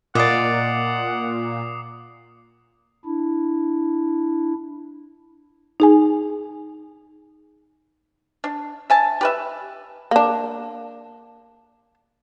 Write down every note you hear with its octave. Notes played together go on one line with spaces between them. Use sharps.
A#2 D5 D#5 F#5 D6 D#6 C7
D4 E4
D#4 G#4 G#5
D4
E5 G#5 A5
G4 B4 E5
A#3 D4